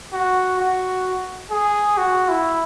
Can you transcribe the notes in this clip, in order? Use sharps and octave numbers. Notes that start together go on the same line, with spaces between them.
F#4
F#4
G#4
F#4
E4